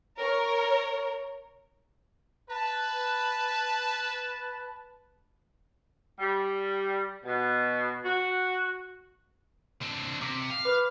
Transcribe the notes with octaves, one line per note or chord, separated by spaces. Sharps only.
A#4 C#5
B4 A5
G3
B2
F#4
C4 D4
C3 D6 B6
F5
B4 D6 F6 F7